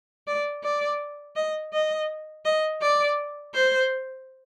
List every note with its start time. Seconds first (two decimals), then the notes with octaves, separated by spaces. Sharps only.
0.27 D5
0.63 D5
1.36 D#5
1.73 D#5
2.45 D#5
2.82 D5
3.54 C5